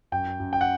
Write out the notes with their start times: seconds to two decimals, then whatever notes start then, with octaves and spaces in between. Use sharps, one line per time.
0.12 F#2 G5
0.40 F#2
0.53 G5
0.61 F#5